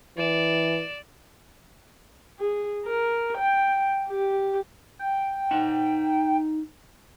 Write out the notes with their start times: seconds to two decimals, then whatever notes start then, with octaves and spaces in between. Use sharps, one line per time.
0.18 E3 D5 E7
2.39 G#4
2.85 A#4
3.38 G5
4.09 G4
4.99 G5
5.51 D#4 F#5